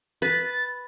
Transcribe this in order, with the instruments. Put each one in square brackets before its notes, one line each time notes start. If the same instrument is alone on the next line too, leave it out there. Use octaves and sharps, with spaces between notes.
[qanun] B4 [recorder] A6